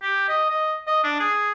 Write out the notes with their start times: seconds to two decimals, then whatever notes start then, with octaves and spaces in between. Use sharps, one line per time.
0.02 G4
0.29 D#5
0.50 D#5
0.87 D#5
1.04 D4
1.20 G#4